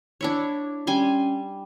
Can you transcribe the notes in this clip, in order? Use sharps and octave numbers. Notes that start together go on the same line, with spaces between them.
D4 E4 C#5
G3 C#4 G#5 C6